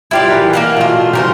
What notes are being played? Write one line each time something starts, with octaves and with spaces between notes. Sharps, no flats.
B2 E4 F4 G4 D5 F5
E3 A#4 B4
A#3 F5 F#5
B2 A3 D4 F4
C#3 E3 F4 G4 A#4 C5